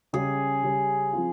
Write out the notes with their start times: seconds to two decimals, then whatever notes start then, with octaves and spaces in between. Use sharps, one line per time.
0.13 C#3 G3 C#4 G4 G#4
0.63 C#3 G3 C#4 G4
1.13 F3 C4 F4